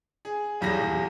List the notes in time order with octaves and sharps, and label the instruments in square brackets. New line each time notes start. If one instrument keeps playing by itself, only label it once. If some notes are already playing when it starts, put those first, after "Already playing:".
[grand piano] G#4
D#1 B1 E2 G3 G#4 A#6